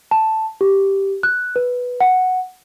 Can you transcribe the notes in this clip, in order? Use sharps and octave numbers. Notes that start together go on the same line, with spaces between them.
A5
G4
F#6
B4
F#5